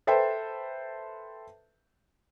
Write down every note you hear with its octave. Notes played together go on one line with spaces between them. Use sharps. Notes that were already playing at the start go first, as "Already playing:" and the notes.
A4 B4 C5 E5 G5 A5